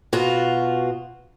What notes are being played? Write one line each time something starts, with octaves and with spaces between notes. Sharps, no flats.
B2 F4 F#4